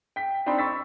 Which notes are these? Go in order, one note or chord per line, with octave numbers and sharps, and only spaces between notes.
G5 B6
C4 D4 D#4 G5 B5 C6
B5 C#6 E6 A6 B6